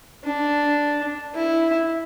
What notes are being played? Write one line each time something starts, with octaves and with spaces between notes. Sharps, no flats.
D4
E4